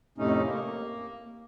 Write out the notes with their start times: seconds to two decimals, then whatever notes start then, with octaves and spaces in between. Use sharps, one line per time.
0.18 F2 A2 C3 A3 C#4 D#4
0.44 A#3